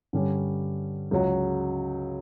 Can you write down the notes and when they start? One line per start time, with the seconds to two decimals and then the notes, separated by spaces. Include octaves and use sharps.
0.13 G2 D3 G3 C#4
1.11 C#2 C#3 F#3